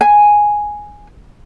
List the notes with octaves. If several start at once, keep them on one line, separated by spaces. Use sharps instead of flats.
G#5